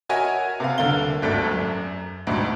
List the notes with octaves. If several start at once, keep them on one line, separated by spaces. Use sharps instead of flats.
F#4 A#4 C#5 D#5 E5 G#5
C3 B3 F5
D#1 D3 A#4 F5 G7
D#1 G#1 D2 A4 D5
F#2
A1 D2 G#2 B2 G3